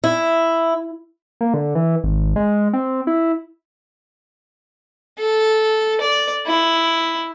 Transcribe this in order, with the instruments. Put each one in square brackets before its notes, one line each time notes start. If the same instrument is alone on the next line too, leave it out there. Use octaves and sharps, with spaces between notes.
[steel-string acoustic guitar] E4
[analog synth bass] A#3
D3
E3
G#1
G#3
C4
E4
[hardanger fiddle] A4
D5
E4